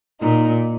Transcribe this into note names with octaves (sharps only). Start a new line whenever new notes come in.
A#2 D#4